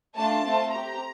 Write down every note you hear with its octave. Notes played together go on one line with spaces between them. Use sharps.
A3 D4 F4 A5
A3 C4 F4
C4 G4 A#5